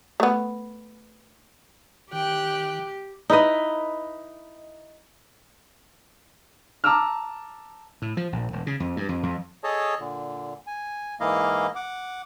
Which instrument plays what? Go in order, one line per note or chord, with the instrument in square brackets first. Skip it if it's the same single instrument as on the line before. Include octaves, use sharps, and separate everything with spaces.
[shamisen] A3 B3
[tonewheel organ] D#3 [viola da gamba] G4 [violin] G5 F#6
[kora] D#4 E4 B4 D#5
[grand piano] A5 A#5 D6 E6 F6
[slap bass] A2
F3
A#1
E1
C#3
F2
G2
F2
F2
[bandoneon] G#4 A4 C#5 D#5 A5
A#2 D3
G#5
G#2 E3 A#3 E4 D#5 F5
F#5 D6